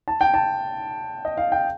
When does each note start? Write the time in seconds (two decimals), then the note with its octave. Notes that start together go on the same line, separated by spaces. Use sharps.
0.08 A5
0.21 G5
0.34 A5
1.25 D#5
1.38 F5
1.52 G5